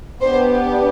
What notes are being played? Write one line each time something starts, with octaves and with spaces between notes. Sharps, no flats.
B3 D4 G4 C5